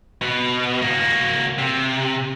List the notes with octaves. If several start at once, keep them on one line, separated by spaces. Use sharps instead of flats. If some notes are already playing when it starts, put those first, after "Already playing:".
B2
A#3 F#4
C3